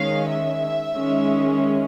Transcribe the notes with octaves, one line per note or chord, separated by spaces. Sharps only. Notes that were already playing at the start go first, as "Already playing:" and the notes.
Already playing: D#3 G#3 C#4 F5
E5
D#3 G#3 C#4